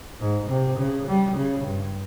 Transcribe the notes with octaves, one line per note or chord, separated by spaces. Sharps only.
G#2
C3
C#3
G3
C#3
G2